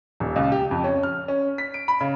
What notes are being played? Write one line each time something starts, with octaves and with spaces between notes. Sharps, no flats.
D#1
C#2
G4
F2
C#4
F6
C#4
B6
D7
B5
C#3